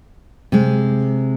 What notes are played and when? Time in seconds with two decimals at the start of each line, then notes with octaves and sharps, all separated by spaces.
0.52 C3 G#3